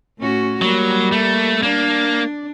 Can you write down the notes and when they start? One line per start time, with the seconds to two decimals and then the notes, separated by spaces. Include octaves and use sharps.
0.19 A2 C#4 F#4
0.62 F#3 G3 A#3
1.12 A3
1.63 A#3 D4